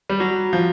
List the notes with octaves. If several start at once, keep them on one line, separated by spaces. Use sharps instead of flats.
G3
F#3
F3